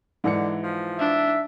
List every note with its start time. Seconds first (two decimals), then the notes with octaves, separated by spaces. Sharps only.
0.24 G#2 D3 E3 C#7
0.63 F3
0.99 D4 E5